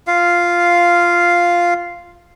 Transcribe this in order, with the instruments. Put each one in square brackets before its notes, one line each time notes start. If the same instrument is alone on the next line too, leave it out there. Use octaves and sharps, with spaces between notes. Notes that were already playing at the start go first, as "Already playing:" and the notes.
[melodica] F4 F5